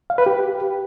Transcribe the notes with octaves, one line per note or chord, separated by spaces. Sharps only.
F5
B4
G4